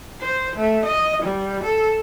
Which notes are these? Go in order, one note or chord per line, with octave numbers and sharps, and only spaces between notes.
C5
A3
D#5
G3
A4